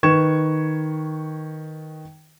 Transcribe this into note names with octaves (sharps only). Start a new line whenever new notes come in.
D#3 B4 C#6 G#6 E7